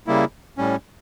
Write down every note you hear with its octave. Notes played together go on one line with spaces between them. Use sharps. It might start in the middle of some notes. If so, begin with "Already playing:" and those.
C#3 G3 A#3 E4
A2 G3 C#4